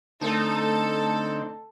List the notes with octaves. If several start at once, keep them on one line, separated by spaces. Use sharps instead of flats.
D3 A3 C4 D#4 A4